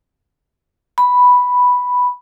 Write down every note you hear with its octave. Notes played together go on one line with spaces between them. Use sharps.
B5